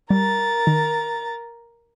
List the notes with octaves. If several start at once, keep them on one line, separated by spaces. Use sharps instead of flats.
G3 A#4 A#5 A6
D#3